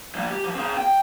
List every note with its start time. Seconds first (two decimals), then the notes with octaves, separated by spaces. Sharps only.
0.15 F3 A#3
0.30 G4
0.44 F3
0.55 C4 G#4
0.77 G5